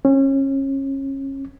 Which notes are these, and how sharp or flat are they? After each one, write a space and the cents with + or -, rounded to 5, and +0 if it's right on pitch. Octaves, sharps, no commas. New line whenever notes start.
C#4 -30